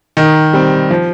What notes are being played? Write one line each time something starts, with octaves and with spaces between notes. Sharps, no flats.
D#3
G3 C4
F3